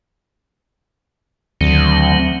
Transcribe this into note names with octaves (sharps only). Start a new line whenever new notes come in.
D2 D#3 F#3 C4